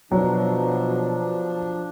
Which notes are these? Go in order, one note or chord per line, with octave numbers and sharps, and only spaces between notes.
B2 F3 F#3 D4